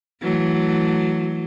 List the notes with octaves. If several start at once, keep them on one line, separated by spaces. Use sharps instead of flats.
E3 F#3 A3